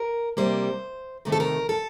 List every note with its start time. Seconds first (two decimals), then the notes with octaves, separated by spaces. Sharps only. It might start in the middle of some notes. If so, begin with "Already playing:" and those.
Already playing: A#4
0.37 C3 G3 A#3 C5
1.25 C3 D#3 A3 A#4
1.32 A4
1.40 A#4
1.69 A4